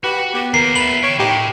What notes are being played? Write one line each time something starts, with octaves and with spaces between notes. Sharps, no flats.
F#4 G4 B4
B3 G4
D#2 A#4 C7
F4 E5 B5 F#7
A#4 C#5 G5
A2 D#4 G4